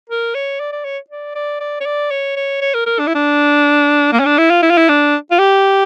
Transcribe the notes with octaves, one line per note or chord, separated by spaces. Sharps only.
A#4
C#5
D5
D5
C#5
D5
D5
D5
C#5
D5
C#5
C#5
C#5
A#4
A#4
D4
E4
D4
A#3
C#4
D4
E4
F4
E4
F4
E4
D4
F4
G4